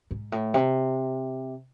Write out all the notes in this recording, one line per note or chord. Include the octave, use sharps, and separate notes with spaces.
G#2
A2
C3